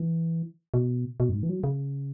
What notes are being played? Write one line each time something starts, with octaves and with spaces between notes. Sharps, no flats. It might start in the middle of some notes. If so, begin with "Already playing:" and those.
Already playing: E3
B2
B2
F#2
G#2
E3
F#3
C#3